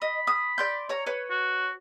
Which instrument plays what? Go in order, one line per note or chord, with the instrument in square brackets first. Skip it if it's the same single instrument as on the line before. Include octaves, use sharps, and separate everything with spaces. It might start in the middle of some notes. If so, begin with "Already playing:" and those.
[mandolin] D#5 [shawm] B5
[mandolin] D#6
D5 C6 G6
C#5 A#5
B4 C#5
[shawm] F#4